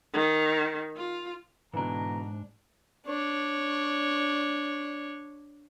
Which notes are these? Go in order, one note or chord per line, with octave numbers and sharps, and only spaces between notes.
D#3
F4
G#2 B2 D3 E3 D4 A#5
D4 C#5